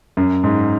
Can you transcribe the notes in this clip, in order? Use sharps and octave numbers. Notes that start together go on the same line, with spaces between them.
F#2
G#2